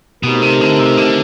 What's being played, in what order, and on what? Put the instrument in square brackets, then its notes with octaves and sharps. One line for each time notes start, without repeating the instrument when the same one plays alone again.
[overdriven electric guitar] B2 [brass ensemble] A3 C4 D#4 G4 A#4
[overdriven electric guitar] C3
D3
C3
D3